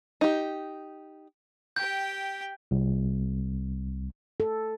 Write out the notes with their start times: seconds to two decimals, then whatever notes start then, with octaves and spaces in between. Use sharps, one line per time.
0.21 D#4 G4
1.76 G4 G5 G6
2.71 C2
4.40 A4